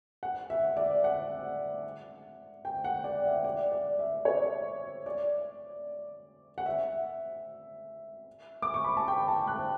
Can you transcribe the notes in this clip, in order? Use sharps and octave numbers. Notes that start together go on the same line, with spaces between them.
F#5
E5
D5
F#5
G5
F#5
D5
E5
D5
D5
E5
C#5
D5
F#5
E5
D6
C#6
B5
A5
G5
A5
F#6